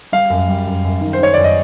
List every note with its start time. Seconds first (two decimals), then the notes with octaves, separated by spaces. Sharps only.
0.12 G3 F5
0.30 F#2
0.48 G3
0.67 F#2
0.84 F#2
1.01 D#3
1.13 C5
1.19 D#3 C#5
1.34 F#2 D5
1.44 D#5